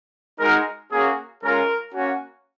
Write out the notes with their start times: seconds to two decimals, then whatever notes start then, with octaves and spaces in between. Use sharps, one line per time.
0.39 G#3 D#4 F#4 A#4
0.91 A#3 C#4 F#4 G#4
1.42 G#3 C#4 F4 A#4
1.94 A#3 C#4 F#4